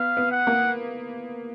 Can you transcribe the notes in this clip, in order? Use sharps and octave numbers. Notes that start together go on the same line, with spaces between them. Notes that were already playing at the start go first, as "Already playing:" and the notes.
Already playing: B3 F5
B3
F#5
A#3